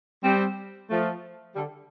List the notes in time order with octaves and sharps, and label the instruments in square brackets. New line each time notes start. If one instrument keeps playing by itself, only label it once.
[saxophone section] G3 C4
F3 A3
D3 G3